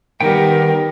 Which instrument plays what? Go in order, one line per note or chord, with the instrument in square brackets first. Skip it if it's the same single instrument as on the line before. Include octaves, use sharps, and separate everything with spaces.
[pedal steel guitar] D#3 B3 G5 [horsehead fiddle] G3 A#4